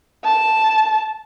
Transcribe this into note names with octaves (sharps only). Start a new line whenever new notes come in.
A5